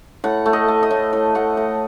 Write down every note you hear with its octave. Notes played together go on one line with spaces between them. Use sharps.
A2 F#5
A3
D#5
A3
D#5
A2
A2 D#5
A3 F#5
A3 D#5